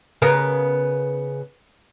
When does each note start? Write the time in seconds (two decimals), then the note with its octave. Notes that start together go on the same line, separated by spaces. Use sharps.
0.22 C#3 B3 A#4